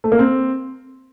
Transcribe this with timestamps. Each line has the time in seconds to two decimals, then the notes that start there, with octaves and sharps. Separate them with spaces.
0.04 A3
0.12 A#3
0.19 C4